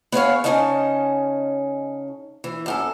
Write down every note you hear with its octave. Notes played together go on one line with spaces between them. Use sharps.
B3 G#4 C#5 F5
C#3 F#3 C#4 D#4 D#5 A5
E3
F#2 G4 A4